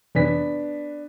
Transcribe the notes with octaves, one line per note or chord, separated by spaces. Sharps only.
F2 C3 E3 B3 D4 B6